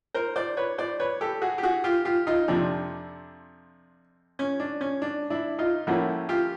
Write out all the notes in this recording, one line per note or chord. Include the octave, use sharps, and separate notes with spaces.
A#4 C5
C5 D5
B4 C#5
C5 D5
B4 C#5
G4 A4
F#4 G#4
G4
F#4 G#4
F4 G4
F4 G4
D#4 F4
F2 C3 F3 D4
C#4
D4
C#4
D4
D4 E4
D#4 F4
A2 F3 A#3 C#4 E4 F#4
F4 G4